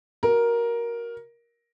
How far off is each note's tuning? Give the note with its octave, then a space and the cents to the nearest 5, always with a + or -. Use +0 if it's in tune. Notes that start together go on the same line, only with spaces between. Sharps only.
F#4 +5 A#4 +10